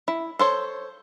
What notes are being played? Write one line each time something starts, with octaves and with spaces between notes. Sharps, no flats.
E4
A4 C5 C#5